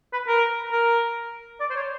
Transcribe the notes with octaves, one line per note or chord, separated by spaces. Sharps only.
B4
A#4
A#4
D5
C5
C#5